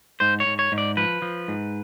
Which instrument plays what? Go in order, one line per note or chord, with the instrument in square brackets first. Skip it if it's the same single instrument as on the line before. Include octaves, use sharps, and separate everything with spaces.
[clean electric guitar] G#2 C5
C#5
G#2
C#5
G#2
D5
F3 B4
F3
G#2